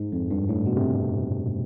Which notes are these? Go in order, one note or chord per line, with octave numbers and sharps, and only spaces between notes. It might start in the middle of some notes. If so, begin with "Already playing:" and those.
Already playing: G#2
F2
G2
A2
B2
C3